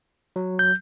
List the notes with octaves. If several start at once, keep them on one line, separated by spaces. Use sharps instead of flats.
F#3
G6